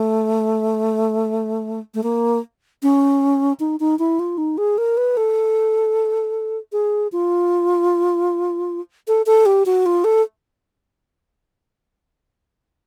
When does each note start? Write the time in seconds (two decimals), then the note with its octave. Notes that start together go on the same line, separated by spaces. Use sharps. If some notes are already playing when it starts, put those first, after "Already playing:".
Already playing: A3
1.94 A3
2.03 A#3
2.82 C#4
3.60 D#4
3.80 D#4
3.99 E4
4.19 F4
4.38 D#4
4.58 G#4
4.78 A#4
4.97 B4
5.17 A4
6.72 G#4
7.12 F4
9.08 A4
9.26 A4
9.46 G4
9.66 F#4
9.86 F4
10.04 A4